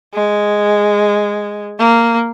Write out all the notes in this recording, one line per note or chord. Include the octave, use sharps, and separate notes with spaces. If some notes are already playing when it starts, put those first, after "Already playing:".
G#3
A#3